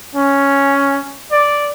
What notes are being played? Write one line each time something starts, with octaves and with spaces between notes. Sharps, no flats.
C#4
D5